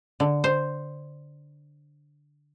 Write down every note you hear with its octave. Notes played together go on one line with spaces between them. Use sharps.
D3
C5